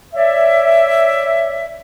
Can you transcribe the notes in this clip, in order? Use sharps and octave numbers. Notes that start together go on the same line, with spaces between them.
C#5 D5 E5